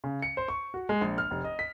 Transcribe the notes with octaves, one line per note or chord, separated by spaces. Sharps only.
C#3
C#7
C5
C#6
F#4
G#3
A#1
F6
F1
D#5
B6